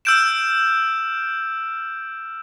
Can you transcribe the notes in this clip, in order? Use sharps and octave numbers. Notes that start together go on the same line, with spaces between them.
E6 F6 G6 D7 E7